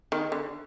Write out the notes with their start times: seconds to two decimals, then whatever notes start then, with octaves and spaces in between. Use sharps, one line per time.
0.12 D#3
0.32 D3